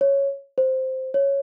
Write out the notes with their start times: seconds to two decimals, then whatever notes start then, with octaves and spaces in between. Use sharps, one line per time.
0.01 C#5
0.58 C5
1.14 C#5